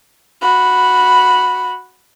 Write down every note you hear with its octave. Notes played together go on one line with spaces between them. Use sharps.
F#4 B5